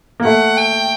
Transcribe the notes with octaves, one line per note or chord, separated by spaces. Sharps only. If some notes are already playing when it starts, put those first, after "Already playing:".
A#3
A3 F#5
G5